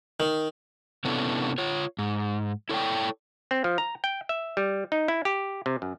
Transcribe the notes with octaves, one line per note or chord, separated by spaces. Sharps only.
D#3
C3 B3 C#4 D4 E4 A4
F4 C#5
G#2
E4 A4 C#5 D5 G5
C4
F3
A#5
G5
E5
G3
D#4
E4
G4
C3
F#2